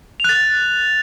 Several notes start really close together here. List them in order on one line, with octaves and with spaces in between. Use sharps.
F7 F#6 A6